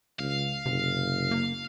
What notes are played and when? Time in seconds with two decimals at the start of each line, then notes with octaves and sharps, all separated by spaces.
0.19 C#2 F5
0.66 F#1 C3
1.31 A#3